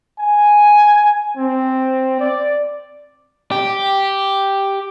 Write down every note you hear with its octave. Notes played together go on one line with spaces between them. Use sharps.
G#5
C4
D5
G4